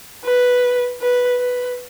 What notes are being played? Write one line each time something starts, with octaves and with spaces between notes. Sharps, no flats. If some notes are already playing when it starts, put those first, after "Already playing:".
B4
B4
B4